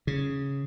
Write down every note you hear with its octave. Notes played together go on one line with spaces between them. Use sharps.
C#3